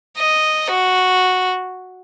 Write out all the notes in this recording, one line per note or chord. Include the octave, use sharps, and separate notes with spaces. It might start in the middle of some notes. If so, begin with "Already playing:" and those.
D#5
F#4